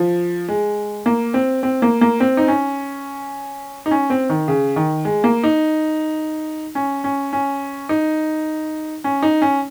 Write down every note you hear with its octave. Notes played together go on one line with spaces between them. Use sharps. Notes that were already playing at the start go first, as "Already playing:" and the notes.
Already playing: F3
G#3
A#3
C4
C4
A#3
A#3
C4
D#4
C#4
D#4
C#4
C4
D#3
C#3
D#3
G#3
A#3
D#4
C#4
C#4
C#4
D#4
C#4
D#4
C#4